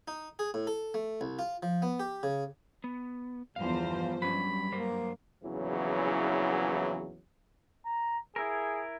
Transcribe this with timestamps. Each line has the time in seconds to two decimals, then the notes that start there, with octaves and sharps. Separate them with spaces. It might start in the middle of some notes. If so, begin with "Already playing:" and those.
0.08 D#4
0.39 G#4
0.54 A2
0.67 A4
0.94 A3
1.21 C2
1.39 F4
1.63 F3
1.82 B3
2.00 G4
2.23 C#3
2.84 B3
3.56 G1 E2 F3 C5 F5
4.22 G2 F#3 C#4 B5
4.72 F#3 A#3 A#4 C5
5.43 A#1 E2 C#3 E3 F#3
7.86 A#5
8.36 E4 G#4 A#4